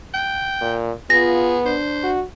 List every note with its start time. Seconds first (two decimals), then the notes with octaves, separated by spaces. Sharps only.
0.14 G5
0.61 A#2
1.10 B3 F4 G#4 A#6
1.66 D4 C5
2.04 F#4